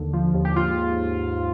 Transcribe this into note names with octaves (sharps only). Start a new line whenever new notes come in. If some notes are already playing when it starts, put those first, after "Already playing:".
Already playing: D#2 D3
F3
D#2
G4
G#2 F4